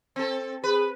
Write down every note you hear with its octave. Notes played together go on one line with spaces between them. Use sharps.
C4 A4
G#4 B4